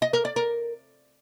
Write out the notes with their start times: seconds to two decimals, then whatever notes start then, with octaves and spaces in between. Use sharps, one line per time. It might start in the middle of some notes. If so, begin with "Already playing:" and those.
0.02 D#5
0.13 A#4
0.25 D5
0.36 A#4